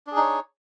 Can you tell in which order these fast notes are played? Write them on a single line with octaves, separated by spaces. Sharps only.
D4 G#4 D#4 C#5